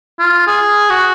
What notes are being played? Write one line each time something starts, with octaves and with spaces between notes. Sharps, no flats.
F4
G#4
F#4